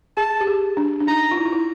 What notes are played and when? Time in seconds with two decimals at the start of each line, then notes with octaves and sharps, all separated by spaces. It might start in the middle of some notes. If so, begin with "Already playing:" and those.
0.17 G#4 A5
0.41 G4
0.47 G#4
0.77 D4
1.00 D4
1.07 D#4 A#5
1.31 F4
1.37 E4
1.45 F4
1.53 E4